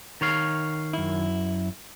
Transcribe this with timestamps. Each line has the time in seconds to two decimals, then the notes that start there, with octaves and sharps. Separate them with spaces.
0.21 D#3 C#5 F5
0.93 F#2 E4